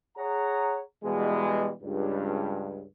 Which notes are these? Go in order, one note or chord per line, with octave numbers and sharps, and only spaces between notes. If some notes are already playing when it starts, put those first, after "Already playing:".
G#4 C#5 F#5 A#5
B2 E3 G3 G#3
C#2 G2